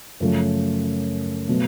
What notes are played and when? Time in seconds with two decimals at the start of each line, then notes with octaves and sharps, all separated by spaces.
0.20 F#2 C#3 F3 A3 C#4
1.48 B2 F#3 A3